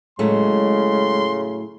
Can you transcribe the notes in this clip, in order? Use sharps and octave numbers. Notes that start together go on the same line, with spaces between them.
A2 C#3 F#3 G#3 A3 C6